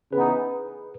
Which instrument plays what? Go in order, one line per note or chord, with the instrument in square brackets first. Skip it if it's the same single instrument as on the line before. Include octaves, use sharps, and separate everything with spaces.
[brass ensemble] C#3 E3 B3 D#4 [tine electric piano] G#4 B4